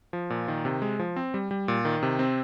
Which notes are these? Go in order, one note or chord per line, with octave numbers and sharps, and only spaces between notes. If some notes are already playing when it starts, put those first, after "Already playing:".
F3
A#2
D#3
C3
G#3
F3
C4
G3
G3
A#2
D#3
C3
C4